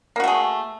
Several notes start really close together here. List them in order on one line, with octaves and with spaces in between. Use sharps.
A#3 F#4 A3 G#4